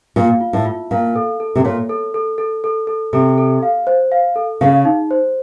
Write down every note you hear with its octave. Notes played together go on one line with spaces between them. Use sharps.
A#2 F5
F4
A2
F4
A#2 F5
A4
A4
C3
A#2 C#5
A4
A4
A4
A4
A4
C3 A4
A4
F5
C5
F5
A4
C#3 F5
D#4
C5